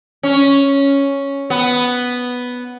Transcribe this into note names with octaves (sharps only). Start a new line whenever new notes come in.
C#4
B3